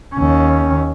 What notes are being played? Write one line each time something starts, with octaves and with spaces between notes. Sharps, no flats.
D#2 C#4